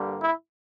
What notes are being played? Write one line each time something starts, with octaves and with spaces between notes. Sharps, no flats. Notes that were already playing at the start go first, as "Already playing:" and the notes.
Already playing: G2 D3 G3 A#3
E4